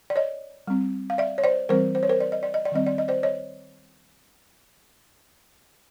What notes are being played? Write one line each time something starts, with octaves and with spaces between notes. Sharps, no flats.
D5
C#5 D#5
G3 C4
F5
D5 E5
C#5
C5 D5
E3 G3 C4 A#4 C5
C5
C#5
A#4 C5
D5
D#5
D5
D#5
D5
D#3 G3 C4 D#5
D5
D#5
C5 D5
C#5 D#5